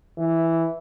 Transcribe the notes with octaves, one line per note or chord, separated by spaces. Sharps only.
E3